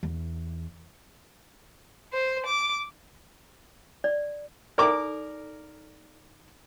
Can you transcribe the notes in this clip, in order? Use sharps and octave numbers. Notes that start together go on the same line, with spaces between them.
E2
C5
D6
D5
D#4 A4 A#4 D5 D6